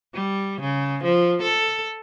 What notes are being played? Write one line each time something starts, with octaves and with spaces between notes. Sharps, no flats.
G3
C#3
F3
A4